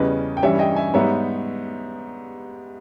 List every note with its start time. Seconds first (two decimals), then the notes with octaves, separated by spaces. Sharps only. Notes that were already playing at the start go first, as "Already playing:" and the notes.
Already playing: E2 C#3 G3 C#4 B4 D#5
0.37 G5
0.42 G2 E3 G3 C#4 C#5 E5
0.59 D#5 G5
0.76 E5 G#5
0.94 G#2 G3 B3 D#4 C#5 E5